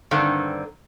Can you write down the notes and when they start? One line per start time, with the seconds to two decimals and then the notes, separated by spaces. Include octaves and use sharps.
0.11 G2 D3 D#3 C4